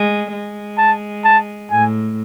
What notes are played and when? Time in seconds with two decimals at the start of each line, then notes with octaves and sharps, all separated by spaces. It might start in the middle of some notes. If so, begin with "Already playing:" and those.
Already playing: G#3
0.32 G#3
0.78 A5
1.24 A5
1.71 A2 G#5